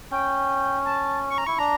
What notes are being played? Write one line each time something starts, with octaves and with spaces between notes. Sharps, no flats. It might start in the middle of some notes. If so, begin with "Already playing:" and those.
C#4 G5
A5
C#6
A#5
E4 C#6
D4 A#5